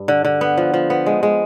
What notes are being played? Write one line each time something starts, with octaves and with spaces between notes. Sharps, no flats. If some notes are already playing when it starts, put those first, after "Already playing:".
Already playing: G2
D3
D3
B3
F3
F3
B3
G#3
G#3